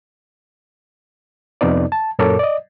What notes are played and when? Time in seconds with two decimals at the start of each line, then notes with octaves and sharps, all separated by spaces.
1.61 F2 C3 B3 D#4 D5
1.92 A5
2.19 F#2 A#2 A4 A#4 C#5 D6
2.39 D5 D#5